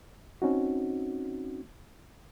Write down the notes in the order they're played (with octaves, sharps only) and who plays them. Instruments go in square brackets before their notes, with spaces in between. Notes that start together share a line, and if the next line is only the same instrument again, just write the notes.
[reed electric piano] C4 C#4 D#4 F#4